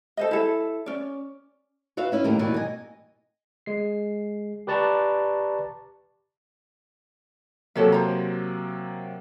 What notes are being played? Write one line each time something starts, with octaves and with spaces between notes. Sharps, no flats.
A4 C5 D#5
E4 A4
C#4 D5
F#4 B4 E5 F5
C#4 E4 B4
D#2 A2 G4 A#4
D#2 B2 E3 G3
D#5 G#5
G#3 C7
G4 B4 D5 A5 A#5 C#6
C3 F#3 A#3 A4 C#5 E5
C5 A#5